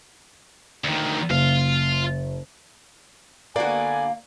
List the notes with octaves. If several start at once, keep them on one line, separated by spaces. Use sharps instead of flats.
D2 D#3
F#1 F4 F5
D3 A#3 B3 F#4 D5 G#5